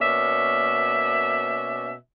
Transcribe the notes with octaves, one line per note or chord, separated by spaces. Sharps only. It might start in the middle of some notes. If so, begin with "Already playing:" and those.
B2 A#3 C#4 D5 E5